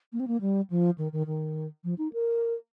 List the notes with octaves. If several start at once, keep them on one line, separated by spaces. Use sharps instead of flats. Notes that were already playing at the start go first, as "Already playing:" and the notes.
A#3
C4
A#3
G3
F3
D#3
D#3
D#3
F3
D#4
A#4